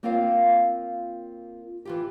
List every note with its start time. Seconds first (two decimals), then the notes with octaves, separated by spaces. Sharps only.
0.03 A#3 C4 F4 A#4 C#5 F5
1.85 E3 F4 G4